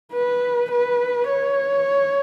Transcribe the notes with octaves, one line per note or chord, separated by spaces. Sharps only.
B4
B4
C#5